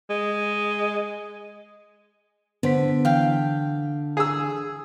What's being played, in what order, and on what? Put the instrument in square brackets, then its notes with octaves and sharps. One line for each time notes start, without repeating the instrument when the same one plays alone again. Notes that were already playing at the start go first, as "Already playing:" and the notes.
[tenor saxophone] G#3
[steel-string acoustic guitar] D3 [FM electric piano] B3 C5 B6
[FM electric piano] E3 [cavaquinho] F5 G5
[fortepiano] G#4 E6